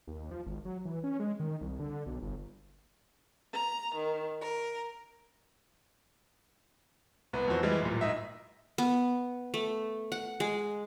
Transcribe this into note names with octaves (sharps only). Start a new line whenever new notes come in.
D#2
F3
G#1
F#3
E3
C#4
G#3
D#3
C2
D3
B1
G1
A#5
D#3
A#4
C2 B3
F2 E3 F#4 C5
E3 G3 G#3
D1 A#2
G#2 D#5 E5
B3
A3
F#5
G#3